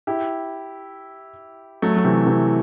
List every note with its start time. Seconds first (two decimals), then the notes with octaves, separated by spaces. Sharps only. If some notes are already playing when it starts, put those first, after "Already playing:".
0.07 E4 G4
1.82 F#3 A3
1.96 F#3
2.04 C3 E3
2.26 C3 E3